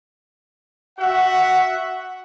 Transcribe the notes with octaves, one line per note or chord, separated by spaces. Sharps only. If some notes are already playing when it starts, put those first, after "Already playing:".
F#4 E5 F#5